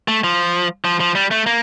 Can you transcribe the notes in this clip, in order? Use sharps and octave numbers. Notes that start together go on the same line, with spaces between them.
A3
F3
F3
F3
G3
A3
A#3